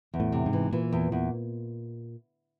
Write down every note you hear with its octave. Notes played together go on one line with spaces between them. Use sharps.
E2
A2
C3
G#2
E3
A#2 E3
E2
E2